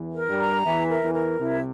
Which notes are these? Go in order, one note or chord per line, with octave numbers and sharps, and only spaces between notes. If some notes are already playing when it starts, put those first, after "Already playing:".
Already playing: E2 E3
A#4
G2 G3
A#5
E2 E3 E5
A#4
E2 E3
A#4
C2 C3 E4